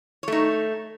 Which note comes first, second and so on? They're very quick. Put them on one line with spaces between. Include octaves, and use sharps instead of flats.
C#5 A3 D#4